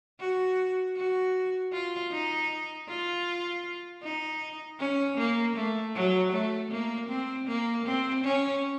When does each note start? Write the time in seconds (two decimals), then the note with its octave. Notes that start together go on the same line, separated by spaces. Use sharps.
0.20 F#4
0.96 F#4
1.73 F4
2.12 D#4
2.88 F4
4.03 D#4
4.80 C#4
5.18 A#3
5.56 A3
5.95 F#3
6.32 A3
6.71 A#3
7.09 C4
7.47 A#3
7.85 C4
8.24 C#4